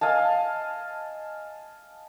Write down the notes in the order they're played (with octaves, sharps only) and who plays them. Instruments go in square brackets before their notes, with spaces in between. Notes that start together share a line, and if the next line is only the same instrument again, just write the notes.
[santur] D#5 F5 G#5 A5